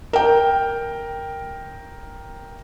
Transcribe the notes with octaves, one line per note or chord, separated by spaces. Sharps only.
A#4 G5